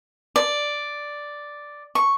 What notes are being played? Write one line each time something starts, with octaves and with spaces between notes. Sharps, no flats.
D5
C#6